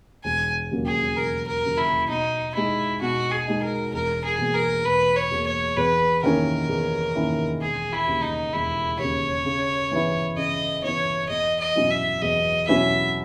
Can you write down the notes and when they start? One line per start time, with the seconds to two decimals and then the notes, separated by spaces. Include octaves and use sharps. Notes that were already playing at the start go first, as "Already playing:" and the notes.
0.24 E1 G#5
0.71 D#2 C#3 F#3 A#3
0.86 G#4
1.16 E1 A#4
1.47 A#4
1.63 D#2 C#3 F#3 A#3
1.78 E4
2.09 B2 D#4
2.55 G#3 D#4 E4
3.01 B2 F#4
3.31 G#4
3.47 G#3 D#4
3.63 A#4
3.94 E1 A#4
4.24 G#4
4.39 E2 B2 A#3
4.55 A#4
4.85 E1 B4
5.16 C#5
5.31 E2 B2 A#3
5.47 C#5
5.77 E2 B4
6.23 D#3 A#3 C#4 E4 A#4
6.69 E2
7.15 D#3 A#3 C#4 E4
7.61 E1 G#4
7.93 E4
8.07 D#2 C#3
8.23 D#4
8.53 E1 E4
8.99 D#2 C#3 C#5
9.45 C#3
9.91 E3 B3 E4
10.37 C#3 D#5
10.83 E3 B3 E4 C#5
11.29 E2 D#5
11.60 D#5
11.75 B2 F#3 C#4 E4
11.91 E5
12.22 E2 D#5
12.68 B2 F#3 C#4 E4 E5